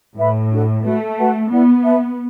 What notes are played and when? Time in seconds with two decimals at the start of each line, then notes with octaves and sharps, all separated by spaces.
0.17 A2 B4 E5 B5
0.51 D4 F#4 A4
0.84 A3 F#4 B4 E5
1.16 F#4 B4 F#5 A5
1.50 B3 E4 D5 F#5
1.83 B4 E5 A5